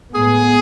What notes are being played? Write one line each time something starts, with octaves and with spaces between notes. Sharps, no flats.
A2 G#3 B3 G#4